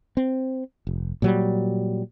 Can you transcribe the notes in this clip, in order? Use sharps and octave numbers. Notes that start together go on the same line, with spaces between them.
C4
F1
A#2 F#3 G3